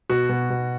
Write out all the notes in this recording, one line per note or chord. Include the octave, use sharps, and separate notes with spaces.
B2 F#4
B2
B2